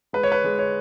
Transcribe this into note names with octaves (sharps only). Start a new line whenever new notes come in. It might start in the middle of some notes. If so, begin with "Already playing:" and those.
G#3 B4
C#5
B4
G#3
C#5